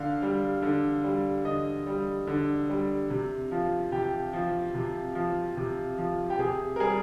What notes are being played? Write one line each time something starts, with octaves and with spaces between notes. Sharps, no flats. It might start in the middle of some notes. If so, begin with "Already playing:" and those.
Already playing: D3 F5
G3
D3
G3
D3 D#5
G3
D3
G3
C3
F3
C3 G4
F3
C3
F3
C3
F3
G4
C3 G#4
A#4
G3 G#4